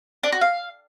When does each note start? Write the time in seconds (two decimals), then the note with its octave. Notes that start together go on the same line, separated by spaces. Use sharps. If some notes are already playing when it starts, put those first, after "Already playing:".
0.23 D4
0.32 F#4
0.41 F5